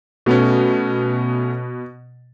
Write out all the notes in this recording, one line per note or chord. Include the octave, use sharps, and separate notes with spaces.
B2 A3 B3 C#4